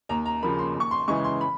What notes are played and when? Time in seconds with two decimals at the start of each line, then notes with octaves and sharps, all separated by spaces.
0.09 D#2 A#5
0.26 A#5
0.43 C#3 F3 A#3 B5
0.59 C6
0.75 D#2
0.80 C#6
0.91 C6
1.08 C#3 E3 G#3 C#6
1.24 C6
1.41 B5